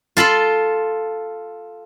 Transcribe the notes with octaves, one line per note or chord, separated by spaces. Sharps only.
F4 A4 B5 C6